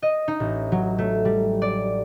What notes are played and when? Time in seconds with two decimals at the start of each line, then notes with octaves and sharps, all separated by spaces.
0.02 D#5
0.28 D#4
0.40 A1
0.72 F#3
0.98 A3
1.25 G3
1.62 D5